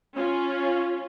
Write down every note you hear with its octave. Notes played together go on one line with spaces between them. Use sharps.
C#4 F4